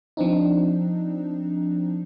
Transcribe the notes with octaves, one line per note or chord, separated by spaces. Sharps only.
F3 C4 D4 D#4